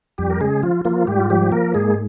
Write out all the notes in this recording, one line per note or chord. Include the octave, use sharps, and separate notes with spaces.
F2 G3 G4
A#4
C#3 G#3 G#4
F3 F4
F3 A#3 F4
G#2 G3 G4
F4
F3 G3 G4
A#3 A#4
G#2 G#3 G#4